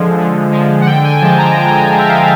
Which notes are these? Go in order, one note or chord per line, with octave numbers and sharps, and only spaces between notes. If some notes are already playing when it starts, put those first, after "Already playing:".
Already playing: D3 F3 G#3
D3
F3 G#3
F#5
D3 G5
G#5
F3 G#3 A5
A#5
D3 A#5
G#5
F3 G#3
E5
F5